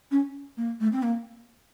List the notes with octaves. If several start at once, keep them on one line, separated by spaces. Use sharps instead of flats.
C#4
A#3
A3
C4
A#3